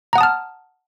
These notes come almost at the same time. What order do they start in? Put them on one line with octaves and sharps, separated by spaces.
A#5 F#5 D#6 A5 F6